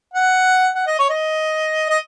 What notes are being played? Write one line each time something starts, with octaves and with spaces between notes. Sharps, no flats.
F#5
F#5
D#5
C#5
D#5
D#5